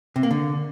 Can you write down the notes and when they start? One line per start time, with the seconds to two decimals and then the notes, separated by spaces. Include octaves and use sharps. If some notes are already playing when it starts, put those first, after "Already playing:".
0.16 C3
0.23 A#3
0.31 D3